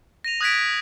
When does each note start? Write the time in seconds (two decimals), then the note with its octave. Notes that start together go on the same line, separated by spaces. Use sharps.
0.24 A#6 D#7 F7
0.41 D#6 F#6 G#6 A#6 B6 D7